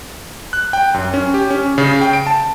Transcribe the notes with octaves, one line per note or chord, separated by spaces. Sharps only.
F#6
G5
F#2
C#4
G4
C#4
C#3
G5
D7
A5